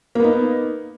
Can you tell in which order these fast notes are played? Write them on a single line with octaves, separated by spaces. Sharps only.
A#3 B3 D#4